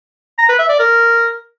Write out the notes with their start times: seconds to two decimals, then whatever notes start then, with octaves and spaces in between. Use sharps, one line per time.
0.39 A#5
0.49 B4
0.59 E5
0.69 D5
0.79 A#4